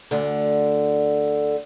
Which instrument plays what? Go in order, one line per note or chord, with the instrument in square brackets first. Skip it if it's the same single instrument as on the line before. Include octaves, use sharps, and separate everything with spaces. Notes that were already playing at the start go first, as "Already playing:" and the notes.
[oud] D2 D3